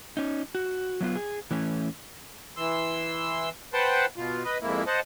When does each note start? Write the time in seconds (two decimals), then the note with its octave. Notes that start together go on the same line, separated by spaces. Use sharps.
0.17 C#4 D#4
0.55 F#4
1.01 F#3 B3 F4
1.15 G#4
1.51 E3 A3 C#4
2.57 E3 C6 E6
3.73 B4 C5 F#5 G5 A5 C6
4.17 B2 F4
4.45 B4 D#5
4.62 F2 G#2 A#3 E4
4.87 C5 D#5 F#5 A5